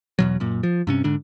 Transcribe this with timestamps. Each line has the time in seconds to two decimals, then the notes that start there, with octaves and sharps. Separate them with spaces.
0.19 E2 B2 F#3
0.40 F#2 A#2
0.63 F3
0.87 G2 C3 C#4
1.04 G#2 D3 D4